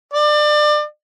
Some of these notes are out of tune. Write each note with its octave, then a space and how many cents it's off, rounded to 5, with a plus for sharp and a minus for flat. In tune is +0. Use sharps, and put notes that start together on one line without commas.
D5 +30